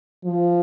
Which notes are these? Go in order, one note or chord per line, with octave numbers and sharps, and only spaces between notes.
F3